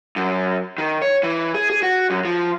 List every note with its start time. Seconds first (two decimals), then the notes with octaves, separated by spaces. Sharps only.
0.16 F#2
0.78 D#3
1.02 C#5
1.23 E3
1.54 G#4
1.70 G#4
1.83 F#4
2.10 F#2
2.25 F3